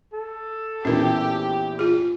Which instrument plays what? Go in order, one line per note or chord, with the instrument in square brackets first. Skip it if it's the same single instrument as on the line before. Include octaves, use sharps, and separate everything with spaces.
[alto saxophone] A4
[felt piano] A#1 E2 E3 [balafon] C#4 A#4 [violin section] G4
[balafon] F4 G#4